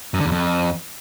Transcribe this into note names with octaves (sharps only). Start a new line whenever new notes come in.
F#2
D3
E2
F2